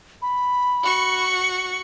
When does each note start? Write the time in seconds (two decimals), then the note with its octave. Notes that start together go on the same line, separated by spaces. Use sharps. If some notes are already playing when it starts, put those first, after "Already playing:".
0.22 B5
0.82 F#4 C#6